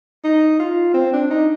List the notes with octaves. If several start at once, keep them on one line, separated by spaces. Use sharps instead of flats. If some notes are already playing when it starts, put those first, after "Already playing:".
D#4
F4
C4
D4
D#4